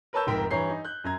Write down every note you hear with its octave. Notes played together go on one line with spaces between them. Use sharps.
A#4 B4 C#5 A5 E6 G6
F1 G#2 A#4 G5 B6
G2 E3 C#5 A#5 G6 C7
D#4
F#6 G6
F#2 A#5 G#6